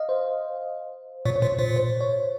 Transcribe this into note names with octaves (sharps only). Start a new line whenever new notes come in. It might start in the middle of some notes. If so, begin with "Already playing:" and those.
Already playing: D#5 F5
C5
A#2 C#5
C#5
A#2 C5
A#2 C5
C5
C#5